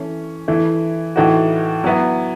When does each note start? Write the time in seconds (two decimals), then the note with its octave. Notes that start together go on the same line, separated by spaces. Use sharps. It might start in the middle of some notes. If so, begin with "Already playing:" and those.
Already playing: E3 A3 C#4
0.48 E3 A3 E4
1.16 A2 E3 A3 D#4 F#4
1.84 F#3 B3 E4